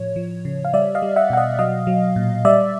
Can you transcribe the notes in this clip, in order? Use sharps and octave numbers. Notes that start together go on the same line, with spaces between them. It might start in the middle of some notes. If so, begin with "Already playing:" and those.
Already playing: A2 F3 C#5
F3
C#3
F5
G3 D5 E5
D#5 F5
G3
E5 F#5
B2 F#5
D#5 F5
F#3 D#5 F5
F#3
A#2
G3 D5 E5